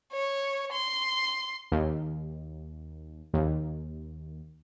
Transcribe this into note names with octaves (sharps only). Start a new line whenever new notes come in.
C#5
C6
D#2
D#2